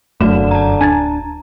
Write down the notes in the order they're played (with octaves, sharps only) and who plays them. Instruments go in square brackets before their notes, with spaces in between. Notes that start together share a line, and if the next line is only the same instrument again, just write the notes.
[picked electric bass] F1 F#2 [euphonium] D3 [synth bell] F#3 F#4 E7 [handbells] A3
[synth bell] A5 A#5
[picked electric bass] D1 D4 [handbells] G#5 G#6 A6